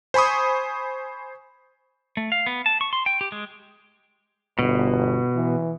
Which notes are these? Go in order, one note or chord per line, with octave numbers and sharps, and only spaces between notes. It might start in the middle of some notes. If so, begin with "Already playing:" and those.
C5 G#5 B5 C#6 D#6
A3
F5
B3
A5
C#6
C6
G5
G4
G#3
G1 B2
E3